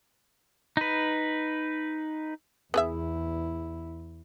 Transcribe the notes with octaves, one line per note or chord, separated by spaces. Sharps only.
D#4 B4
E2 B3 E4 G#4 E5